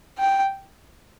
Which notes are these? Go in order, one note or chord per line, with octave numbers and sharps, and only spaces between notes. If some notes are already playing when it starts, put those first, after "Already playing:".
G5